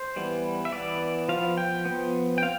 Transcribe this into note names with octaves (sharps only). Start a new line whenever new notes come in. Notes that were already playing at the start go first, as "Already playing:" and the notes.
Already playing: C5
E3 G3 B3
E5
E3 B3 D5
F3 B3 F5
G5
F3 B3
G5
C4 F5